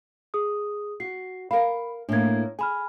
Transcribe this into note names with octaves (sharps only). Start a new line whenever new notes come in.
G#4 D#6
F#4 C7
A#4 F5 B5
A2 A#3 D4 G#6
G#4 G#5 B5 F6